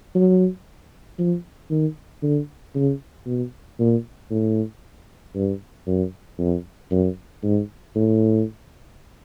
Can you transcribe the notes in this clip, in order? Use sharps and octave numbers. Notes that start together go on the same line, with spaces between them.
F#3
F3
D#3
D3
C#3
B2
A#2
A2
G2
F#2
F2
F#2
G#2
A2